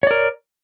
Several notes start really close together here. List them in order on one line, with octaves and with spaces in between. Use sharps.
C#5 D5 A#4